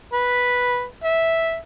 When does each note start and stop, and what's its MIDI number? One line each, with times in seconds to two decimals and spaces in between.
0.13 0.85 71
1.04 1.56 76